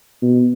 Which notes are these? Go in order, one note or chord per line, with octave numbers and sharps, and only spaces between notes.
B2